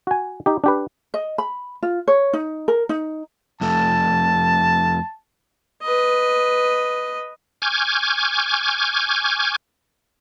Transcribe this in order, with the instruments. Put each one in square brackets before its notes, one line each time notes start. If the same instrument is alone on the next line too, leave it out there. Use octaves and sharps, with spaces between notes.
[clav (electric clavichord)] F#4 G#5
D#4 G4
D4 G4 B4
[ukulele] D#5
B5
F4
C#5
D#4
A#4
D#4
[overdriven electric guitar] F2 A3 [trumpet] A5
[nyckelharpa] B4 D#5
[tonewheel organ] G#5 C#6 D6 F6 G6 G#6